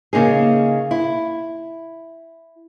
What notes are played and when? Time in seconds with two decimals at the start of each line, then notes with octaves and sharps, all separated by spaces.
0.13 C#3 A#3 D#4 G#4
0.91 E4